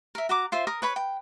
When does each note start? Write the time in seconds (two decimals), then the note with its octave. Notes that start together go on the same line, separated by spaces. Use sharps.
0.15 A#4 E5
0.29 F#4 A#5 D6
0.52 F4 C5 E5
0.67 A#4 D#6
0.82 B4 C#5 B5
0.96 G5